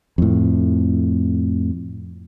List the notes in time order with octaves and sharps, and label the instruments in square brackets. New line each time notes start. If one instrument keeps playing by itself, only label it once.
[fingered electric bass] F2 A2